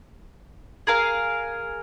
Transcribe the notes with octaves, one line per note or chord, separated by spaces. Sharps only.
G#4 A#4 F5